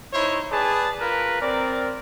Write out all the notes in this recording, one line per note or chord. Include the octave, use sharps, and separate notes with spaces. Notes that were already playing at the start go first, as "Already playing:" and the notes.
D#4 E4 C5 C#5
G#4 B4 D5 A5
F4 A#4 B4
C4 A#4 D5